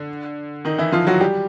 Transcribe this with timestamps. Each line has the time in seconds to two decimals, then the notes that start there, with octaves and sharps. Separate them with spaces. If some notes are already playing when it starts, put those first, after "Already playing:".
Already playing: D3
0.65 D#3 D#4
0.78 E3 E4
0.92 F3 F4
1.07 F#3 F#4
1.21 G3 G4